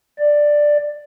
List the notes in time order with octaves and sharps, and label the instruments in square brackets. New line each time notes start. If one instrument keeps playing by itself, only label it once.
[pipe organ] D5